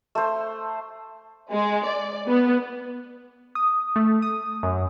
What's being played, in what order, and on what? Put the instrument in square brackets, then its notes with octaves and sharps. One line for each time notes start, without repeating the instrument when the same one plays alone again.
[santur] A3 C5
[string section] G#3
D5
B3
[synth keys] D#6
A3
D#6
F#2